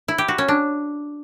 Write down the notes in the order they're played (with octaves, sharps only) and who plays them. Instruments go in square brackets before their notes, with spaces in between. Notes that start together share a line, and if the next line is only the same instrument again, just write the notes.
[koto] E4
G4
F#4
C#4
D4